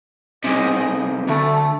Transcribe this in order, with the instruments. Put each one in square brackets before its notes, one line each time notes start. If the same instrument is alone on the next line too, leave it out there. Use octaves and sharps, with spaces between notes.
[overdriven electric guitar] B1 C3 [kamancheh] G#4 D#5
[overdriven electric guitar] D2 [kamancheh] A3 A5